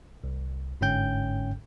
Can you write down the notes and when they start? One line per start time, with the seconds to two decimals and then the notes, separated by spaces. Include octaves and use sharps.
0.24 C2
0.81 G1 G#2 D3 C#4 G5 G6